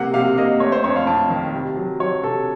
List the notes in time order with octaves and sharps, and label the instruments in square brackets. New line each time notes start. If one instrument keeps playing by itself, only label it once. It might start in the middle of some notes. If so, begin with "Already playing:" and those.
Already playing: [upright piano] C3 A#3 F#5
C3 F5
A#3 D#5
A3 C#5
C5
F2 C#5
F5
F2 A5
D#3
C3
F#3
F#3 C#5
C3 A4